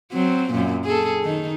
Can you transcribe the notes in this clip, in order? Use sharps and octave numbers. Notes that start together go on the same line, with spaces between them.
F#3 C4
F#2 A#2
G#4 A4
D#3 D#4